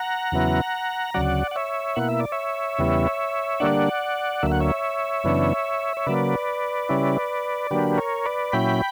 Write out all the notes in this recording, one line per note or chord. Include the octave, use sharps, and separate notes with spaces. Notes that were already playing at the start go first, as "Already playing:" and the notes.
Already playing: F#5 A#5
E2 C#3 F#3 B3 E4
D2 C#3 F#3 D5 F#5
F#5
C#5 E5
B2 A#3 E4 F#5
E5
D5
C#5 E5
E2 C#3 G3 B3 E4
D3 G3 A#3 D4 D5 F#5
D2 D3 F#3 A#3 E5
F#5
C#5 E5
F#2 C#3 E3 B3 D4
C#5
C#3 F#3 A#3 B4 D5
C#3 G3 C#4 E4
D3 F#3 A#3 D4 G4 B4
A#4 C#5
B4 D5
A#2 F#3 C#4 E4 G5 B5